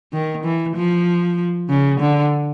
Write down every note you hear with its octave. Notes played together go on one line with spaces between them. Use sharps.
D#3
E3
F3
C#3
D3